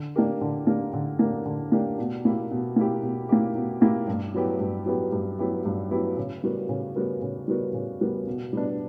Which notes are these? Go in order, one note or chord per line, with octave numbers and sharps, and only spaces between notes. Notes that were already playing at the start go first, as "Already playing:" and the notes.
Already playing: D3
A#3 D4 G4 A#4
D3
A#3 D4 G4 A#4
D3
A#3 D4 G4 A#4
D3
A#3 D4 G4 A#4
B2
A#3 E4 G4
B2
A#3 E4 G4
B2
A#3 E4 G4
B2
A#3 E4 G4
G2
F#3 B3 E4 G4
G2
F#3 B3 E4 G4
G2
F#3 B3 E4 G4
G2
F#3 B3 E4 G4
C#3
G3 B3 F#4 A#4
C#3
G3 B3 F#4 A#4
C#3
G3 B3 F#4 A#4
C#3
G3 B3 F#4 A#4
B2
G3 B3 D4